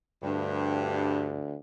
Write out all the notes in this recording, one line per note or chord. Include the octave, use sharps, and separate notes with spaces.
D2 G2